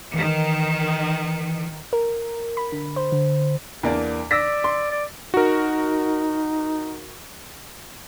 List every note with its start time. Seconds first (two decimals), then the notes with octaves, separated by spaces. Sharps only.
0.14 D#3 E3
1.93 A#4
2.57 B5
2.72 D3
2.96 C5
3.12 D3
3.83 E2 A#3 D4
4.31 D5 E6 A#6 B6
4.64 C6
4.91 D5
5.34 D#4 F#4 A#4